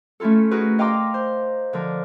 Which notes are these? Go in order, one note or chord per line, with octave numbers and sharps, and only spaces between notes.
A3 C#4 E4 F4 A4
D#4 F#4 G#4 A#4 B4
D#5 F5 G5 A#5 C6 D6
C5
D3 F3 A#4